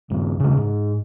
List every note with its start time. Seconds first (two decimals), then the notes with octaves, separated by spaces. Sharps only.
0.10 A#1 G2
0.40 D2 C#3
0.57 G#2